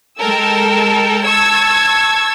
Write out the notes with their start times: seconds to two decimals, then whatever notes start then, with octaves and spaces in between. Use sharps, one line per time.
0.20 G#3 A4 A#4 G5 E6
1.24 A5 C#6 E6 G#6